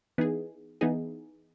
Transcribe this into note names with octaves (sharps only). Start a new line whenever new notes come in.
E3 B3 D#4 G#4
E3 B3 D#4 G#4